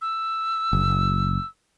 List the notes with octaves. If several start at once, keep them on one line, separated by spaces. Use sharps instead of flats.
E6
F#1